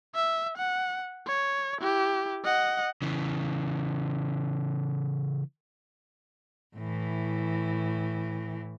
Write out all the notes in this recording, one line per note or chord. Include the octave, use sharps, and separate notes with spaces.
E5
F#5
C#5
E4 G4
D#5 F#5
C#3 E3
A2 E3